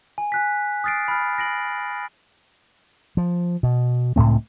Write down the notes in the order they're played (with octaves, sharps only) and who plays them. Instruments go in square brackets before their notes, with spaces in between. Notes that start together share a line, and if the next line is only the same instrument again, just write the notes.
[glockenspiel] G#5
G#5 F#6 B6
D#6 F6 A6 C7 D7
B5 F6
A#6 D7 F#7
[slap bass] F3
B2
C#2 A2 A3 C4